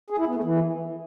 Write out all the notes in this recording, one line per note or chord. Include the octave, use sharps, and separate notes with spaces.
G#4
E4
B3
A3
E3